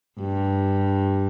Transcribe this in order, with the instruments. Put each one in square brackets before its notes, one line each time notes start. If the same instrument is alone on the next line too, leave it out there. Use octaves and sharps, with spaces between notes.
[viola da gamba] G2